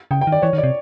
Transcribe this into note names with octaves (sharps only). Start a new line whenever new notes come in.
C#3 G5
G5
D#3
D5
E3 C#5
D#3
D5
C3